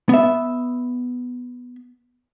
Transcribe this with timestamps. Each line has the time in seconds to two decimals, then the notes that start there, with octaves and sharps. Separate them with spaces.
0.09 B3 E5